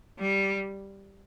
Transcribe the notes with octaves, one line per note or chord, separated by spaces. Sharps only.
G3